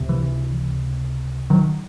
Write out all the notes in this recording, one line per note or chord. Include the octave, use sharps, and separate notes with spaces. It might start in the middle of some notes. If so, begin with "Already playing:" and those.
Already playing: C#2 C3
E3
D#3 F#3